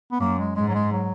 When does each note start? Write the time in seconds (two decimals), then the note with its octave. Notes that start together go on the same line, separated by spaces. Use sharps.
0.12 B3
0.20 F#2 A#3
0.39 G#3
0.56 G#2 G#3
0.68 F#3
0.74 G#3
0.92 F#3